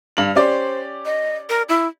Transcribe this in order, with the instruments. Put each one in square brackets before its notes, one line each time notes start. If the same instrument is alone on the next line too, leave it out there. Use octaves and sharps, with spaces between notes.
[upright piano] G2 F5 F#7
[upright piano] C#4 G4 D5 [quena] C5
[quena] D#5
A#4
E4